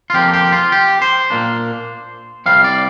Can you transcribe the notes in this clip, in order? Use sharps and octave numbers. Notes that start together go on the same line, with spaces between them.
F4
F2 F3 A#3 G4
G4
F4
G4
C5
A#2 A#3 D4
C2 C3 G3 F5
D5